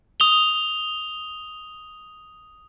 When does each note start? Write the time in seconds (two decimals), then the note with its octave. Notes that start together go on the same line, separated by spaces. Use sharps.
0.20 D#6 F7 G7